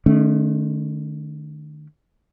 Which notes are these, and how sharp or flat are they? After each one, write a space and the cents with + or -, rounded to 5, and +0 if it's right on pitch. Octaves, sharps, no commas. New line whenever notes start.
D#3 -45 A3 -20 C#4 +0